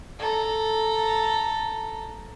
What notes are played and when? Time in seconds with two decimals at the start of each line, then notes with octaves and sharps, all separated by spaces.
0.19 A4 A#5